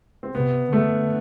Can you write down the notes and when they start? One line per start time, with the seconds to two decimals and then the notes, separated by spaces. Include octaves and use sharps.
0.23 C4
0.35 C3 B3
0.73 D3 A3